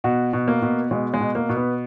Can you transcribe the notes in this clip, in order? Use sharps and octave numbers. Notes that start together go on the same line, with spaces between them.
B2 F#4
B2
A#3
B2
B2 G#3
G#3
B2
A#3
B2
B3